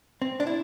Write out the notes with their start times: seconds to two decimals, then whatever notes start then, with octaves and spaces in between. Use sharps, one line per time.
0.22 C4
0.40 D4
0.47 E4